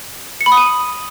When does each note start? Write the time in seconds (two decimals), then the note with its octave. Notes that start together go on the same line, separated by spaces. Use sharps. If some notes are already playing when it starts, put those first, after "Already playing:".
0.41 C#7
0.46 B5
0.52 D#6
0.57 D#7